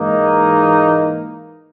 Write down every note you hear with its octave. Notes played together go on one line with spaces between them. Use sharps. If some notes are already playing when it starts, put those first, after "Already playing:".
Already playing: G#2 E3 A#3 D#4